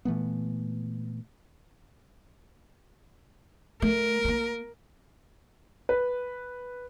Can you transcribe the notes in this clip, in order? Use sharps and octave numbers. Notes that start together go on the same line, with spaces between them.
A#2 E3 A3 B3
A3 A#4
A3 A#3
B4